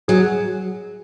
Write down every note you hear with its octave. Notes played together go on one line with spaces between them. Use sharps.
F#3 G#4